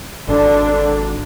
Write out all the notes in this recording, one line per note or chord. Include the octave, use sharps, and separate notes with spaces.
G#1 D3 D4